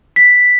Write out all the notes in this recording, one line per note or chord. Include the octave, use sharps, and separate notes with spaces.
B6